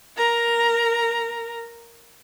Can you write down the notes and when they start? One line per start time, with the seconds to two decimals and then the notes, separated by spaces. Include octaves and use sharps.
0.17 A#4 A#5